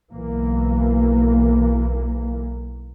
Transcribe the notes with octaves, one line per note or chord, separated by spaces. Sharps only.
B1 E3 A#3